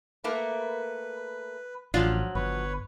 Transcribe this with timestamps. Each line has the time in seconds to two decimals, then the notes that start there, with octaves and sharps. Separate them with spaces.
0.24 A3 A#3 A#4 B4
1.94 A1 F3 F#3 D4 F4
2.35 G1 B4 C#5